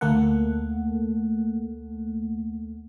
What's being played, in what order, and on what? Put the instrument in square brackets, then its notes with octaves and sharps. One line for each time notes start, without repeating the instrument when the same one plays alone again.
[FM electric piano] D2 A3 A#3 A4 F#5